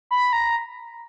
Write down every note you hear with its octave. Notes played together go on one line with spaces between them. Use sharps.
B5
A#5